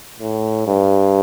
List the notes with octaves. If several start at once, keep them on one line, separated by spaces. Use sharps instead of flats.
A2
G2